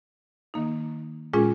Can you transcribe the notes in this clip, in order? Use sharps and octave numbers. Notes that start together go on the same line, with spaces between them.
D#3 A#3 D#4
A#2 G#3 C#4 F4 G#4